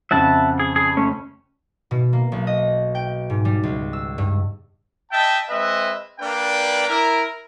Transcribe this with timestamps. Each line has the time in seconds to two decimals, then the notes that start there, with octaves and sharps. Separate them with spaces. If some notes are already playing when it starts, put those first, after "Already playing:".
0.11 F2 C#3 E5 F#5 A5
0.60 G#4
0.76 G#4
0.97 A3 C#4
1.91 B2
2.13 A#3
2.32 B1
2.47 D#5
2.95 G5
3.30 G#2
3.45 G3
3.63 C#2
3.93 E6
4.18 G2
5.11 D#5 E5 G5 A5
5.48 G#3 C4 B4 D#5 E5
6.20 A#3 D4 B4 D5 G5
6.88 E4 A#4